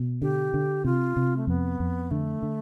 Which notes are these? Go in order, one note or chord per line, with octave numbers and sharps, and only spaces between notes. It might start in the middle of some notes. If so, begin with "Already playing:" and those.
Already playing: B2
D3 G4
D3
C3 F4
C3
A3
F2 B3
F2
D3 A3
D3